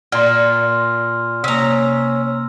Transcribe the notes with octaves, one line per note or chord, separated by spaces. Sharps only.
A#2 C6 F6
C3 A#3 C#4 A#5 E6